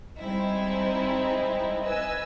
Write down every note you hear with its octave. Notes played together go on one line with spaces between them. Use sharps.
G3 G#3 C4 D#4 E4
B4 D#5 G#5 E6